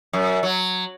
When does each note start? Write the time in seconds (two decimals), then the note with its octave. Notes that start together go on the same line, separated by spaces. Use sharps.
0.13 F#2
0.43 F#3